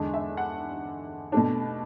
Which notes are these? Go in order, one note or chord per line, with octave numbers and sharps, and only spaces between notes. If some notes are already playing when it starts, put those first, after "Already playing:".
Already playing: E2 D3 G#3 D4
E5
F#5
B2 A3 D4